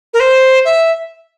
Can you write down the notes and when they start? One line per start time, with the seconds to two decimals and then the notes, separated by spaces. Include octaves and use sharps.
0.14 A#4
0.20 C5
0.65 E5